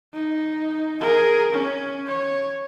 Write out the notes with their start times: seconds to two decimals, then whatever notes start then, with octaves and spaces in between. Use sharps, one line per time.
0.13 D#4
1.01 G#4 A#4
1.52 C#4
2.07 C#5